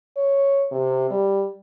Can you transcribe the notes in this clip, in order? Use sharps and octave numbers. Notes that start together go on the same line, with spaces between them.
C#5
C3
G3